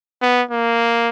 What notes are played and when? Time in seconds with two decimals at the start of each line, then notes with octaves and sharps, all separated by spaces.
0.22 B3
0.51 A#3